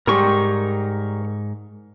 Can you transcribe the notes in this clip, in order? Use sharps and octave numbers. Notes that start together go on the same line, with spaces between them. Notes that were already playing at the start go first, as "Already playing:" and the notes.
G#2 G3 G4 A#4 C#6